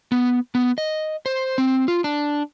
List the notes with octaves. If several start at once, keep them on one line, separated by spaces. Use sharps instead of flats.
B3
B3
D#5
C5
C4
F4
D4